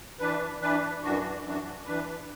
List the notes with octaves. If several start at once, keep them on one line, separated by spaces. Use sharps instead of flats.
E3 D4 B4
E3 D4 B4
F#2 E3 D4 F#4
F#2 E3 D4 F#4
E3 D4 B4